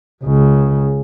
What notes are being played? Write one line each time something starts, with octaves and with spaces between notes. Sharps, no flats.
C#2 C#3